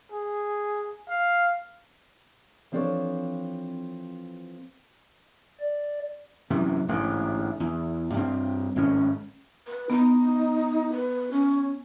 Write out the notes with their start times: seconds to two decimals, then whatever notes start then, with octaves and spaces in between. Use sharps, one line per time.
0.12 G#4
1.09 F5
2.72 E3 F3 C4 D4 A4 C#5
5.60 D5
6.50 F#2 C3 E3
6.88 A1 G#2 D3
7.60 E2
8.14 G2 C4
8.76 G#1 A2 C#4
9.67 B4
9.90 B3 D#4
10.92 B4
11.32 C#4